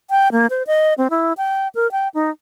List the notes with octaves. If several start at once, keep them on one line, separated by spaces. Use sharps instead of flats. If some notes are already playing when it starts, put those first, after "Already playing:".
G5
A#3
C5
D#5
C4
E4
G5
A#4
G5
D#4